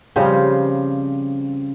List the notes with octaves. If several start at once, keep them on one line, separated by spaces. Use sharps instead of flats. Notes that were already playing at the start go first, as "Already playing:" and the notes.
C#3 F3 G3 C4